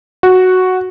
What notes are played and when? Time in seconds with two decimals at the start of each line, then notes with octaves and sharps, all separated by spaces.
0.23 F#4